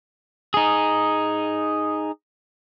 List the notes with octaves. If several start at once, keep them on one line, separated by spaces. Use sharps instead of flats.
D#4 G#4